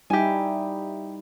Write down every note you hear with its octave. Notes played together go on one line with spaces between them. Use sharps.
G3 D#4 E4 G4 G#5